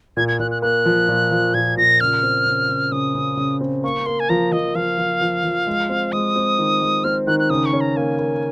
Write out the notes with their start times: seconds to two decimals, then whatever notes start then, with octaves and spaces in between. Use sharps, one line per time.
0.17 A#2 G#6
0.28 G#6
0.40 A#2 F#6
0.51 F#6
0.62 A#3 F#6
0.86 F3
1.09 A#2
1.31 F3
1.54 A#2 G#6
1.77 A#2 A#6
2.00 C#3 F6
2.23 C4
2.46 C#3
2.69 C#3
2.92 C#3 D#6
3.15 C#3
3.37 C#3
3.61 C4
3.84 A#3 C#6
4.06 A#3 C6
4.20 G#5
4.29 F3 A#5
4.52 F3 D#5
4.75 F3 F5
4.98 F3
5.21 F3
5.44 F3
5.67 G#3
5.89 C4
6.12 G#3 D#6
6.36 C4
6.58 D#3
6.82 G#3
7.04 C4 F6
7.27 D#3 F#6
7.39 F#6
7.50 C#3 D#6
7.66 C#6
7.73 C#4
7.81 A#5
7.96 A#3 G#5
8.19 A#3